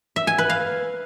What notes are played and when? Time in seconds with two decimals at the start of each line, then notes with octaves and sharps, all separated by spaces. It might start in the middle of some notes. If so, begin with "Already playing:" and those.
0.16 E5
0.27 G#5
0.38 B4
0.50 F5